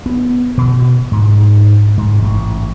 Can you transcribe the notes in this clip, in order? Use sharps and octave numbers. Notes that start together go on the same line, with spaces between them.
B3
B2
G#2
G#2
A1